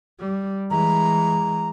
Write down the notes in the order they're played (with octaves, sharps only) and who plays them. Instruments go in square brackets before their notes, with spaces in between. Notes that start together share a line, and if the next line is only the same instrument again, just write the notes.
[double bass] G3
[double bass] E3 G#3 [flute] A#5